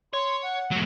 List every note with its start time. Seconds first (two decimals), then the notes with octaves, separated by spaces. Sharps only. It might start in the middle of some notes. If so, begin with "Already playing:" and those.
0.13 C#5 C6
0.43 F#5
0.72 F#3 A3